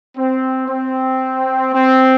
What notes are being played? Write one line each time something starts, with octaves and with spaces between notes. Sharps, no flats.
C4
C4
C4